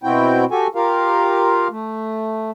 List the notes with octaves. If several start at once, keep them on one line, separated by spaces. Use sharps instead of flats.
B2 C4 E4 F#4 G5
F#4 G4 A4 G#5
F4 G4 A#4 F5
A3